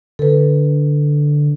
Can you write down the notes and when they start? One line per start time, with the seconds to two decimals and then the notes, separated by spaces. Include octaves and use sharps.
0.19 D3 A4 B4